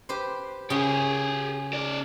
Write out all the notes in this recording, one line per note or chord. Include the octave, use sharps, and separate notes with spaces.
G4 B4 C5
C#3 G4 G#4
C#4 D5